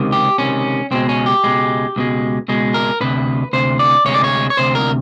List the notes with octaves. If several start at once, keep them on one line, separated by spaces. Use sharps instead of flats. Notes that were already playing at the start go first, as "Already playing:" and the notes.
Already playing: C#2 C3 D#3
G4
C#2 C3 D#3 C#4
C#2 B2 G#3 C4
C#4
G4
C#2 B2 G#3
C#2 B2 G#3
C#2 B2 G#3
A#4
D2 C3 B4
D2 C3 C5
D5
D2 C3 G#3 C#5
D5
C#5
C#5
D2 C3 C5
A#4